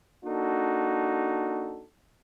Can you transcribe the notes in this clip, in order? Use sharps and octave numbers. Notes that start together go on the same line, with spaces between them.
A#3 D4 D#4 F#4 A4